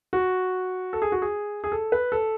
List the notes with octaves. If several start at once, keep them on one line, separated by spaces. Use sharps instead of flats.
F#4
A4
G#4
F#4
G#4
G#4
A4
B4
A4